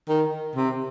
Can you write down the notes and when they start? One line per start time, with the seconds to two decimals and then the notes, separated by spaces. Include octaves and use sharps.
0.09 D#3
0.56 C3